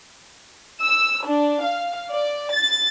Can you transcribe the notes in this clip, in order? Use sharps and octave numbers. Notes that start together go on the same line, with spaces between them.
E6
D4
F5
D5
A6